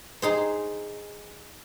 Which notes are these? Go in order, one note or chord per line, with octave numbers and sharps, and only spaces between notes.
D#4 G#4 C5